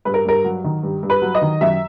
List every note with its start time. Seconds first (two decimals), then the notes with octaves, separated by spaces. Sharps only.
0.05 G2 B4
0.14 A#4
0.25 G2 A#4
0.44 F#3
0.64 D#3
0.83 G2
1.03 G2
1.10 B4
1.22 F#3
1.35 D#5
1.42 D#3
1.61 F#2 E5